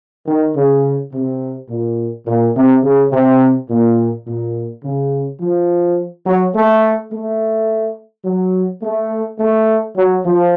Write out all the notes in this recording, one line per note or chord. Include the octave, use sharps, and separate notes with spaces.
D#3
C#3
C3
A#2
A#2
C3
C#3
C3
A#2
A#2
C#3
F3
F#3
A3
A3
F#3
A3
A3
F#3
F3